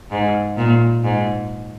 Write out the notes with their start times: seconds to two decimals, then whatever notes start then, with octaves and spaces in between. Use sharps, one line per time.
0.11 G#2
0.57 A#2
1.04 G#2